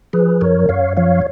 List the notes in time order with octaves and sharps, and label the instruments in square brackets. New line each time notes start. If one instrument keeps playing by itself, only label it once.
[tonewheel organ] F3 G#4 B4
F#2 A#4 C#5
F#2 C#5 F5
F3 C#5 F5